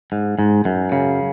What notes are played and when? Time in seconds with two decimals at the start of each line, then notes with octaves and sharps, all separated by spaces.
0.12 G#2
0.39 G#2
0.65 F#2
0.92 C#3